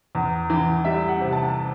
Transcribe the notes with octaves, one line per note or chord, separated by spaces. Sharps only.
E2
E3
G3 E5
F#5
C3
A5